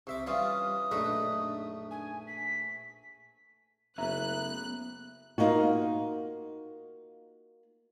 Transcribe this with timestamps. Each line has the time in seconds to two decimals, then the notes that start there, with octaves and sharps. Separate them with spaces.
0.07 C2 C5 E5 D6
0.27 E3 G3 C#4 F4 F5 D#6
0.91 A#1 F#2 A3 D4 D#4 B4
1.90 G#5
2.27 B6
3.98 F#1 A3 B3 C#4 E5 A#5 F#6
5.38 A#3 D#4 F4 F#4